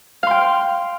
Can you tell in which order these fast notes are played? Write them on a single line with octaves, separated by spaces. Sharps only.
F5 C6 G5